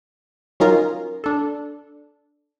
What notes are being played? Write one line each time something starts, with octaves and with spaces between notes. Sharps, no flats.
F#3 C#4 D#4 F4 A#4
D4 A4